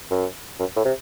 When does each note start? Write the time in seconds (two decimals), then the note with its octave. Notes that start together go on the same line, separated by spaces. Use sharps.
0.11 F#2
0.60 F#2
0.76 A2
0.85 C3